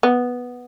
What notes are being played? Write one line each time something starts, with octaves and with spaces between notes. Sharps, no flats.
B3